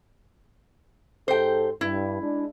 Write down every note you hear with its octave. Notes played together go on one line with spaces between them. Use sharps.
G#2 G4 A4 C5 G5
G2 E4
G#3 D4